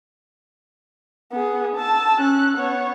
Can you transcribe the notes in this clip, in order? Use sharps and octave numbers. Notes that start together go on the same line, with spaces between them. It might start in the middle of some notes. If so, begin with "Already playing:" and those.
B3 G#4
A5 E6
C#4 F#6
B3 C#5